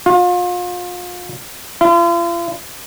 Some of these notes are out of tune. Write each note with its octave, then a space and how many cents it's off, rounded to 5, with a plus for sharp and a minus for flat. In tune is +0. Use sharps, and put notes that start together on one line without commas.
F4 +35
F4 -40